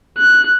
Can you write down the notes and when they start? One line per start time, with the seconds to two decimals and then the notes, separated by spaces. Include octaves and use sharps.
0.18 F#6